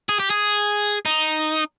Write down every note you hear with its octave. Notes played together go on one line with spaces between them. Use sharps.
G#4
G4
G#4
D#4